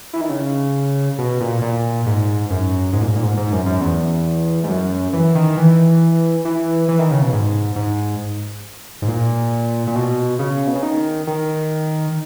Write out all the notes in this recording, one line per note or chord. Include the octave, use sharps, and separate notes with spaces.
E3
D#3
C#3
B2
A#2
A#2
G#2
F#2
G#2
A#2
G#2
A#2
G#2
G#2
F#2
F#2
E2
G#2
F#2
E3
D#3
E3
E3
E3
D#3
C#3
B2
G#2
G#2
G#2
A#2
A#2
B2
C#3
B2
C#3
D#3
D#3